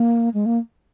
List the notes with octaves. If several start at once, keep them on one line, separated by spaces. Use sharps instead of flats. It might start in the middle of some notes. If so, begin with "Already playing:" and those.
Already playing: A#3
G#3
A#3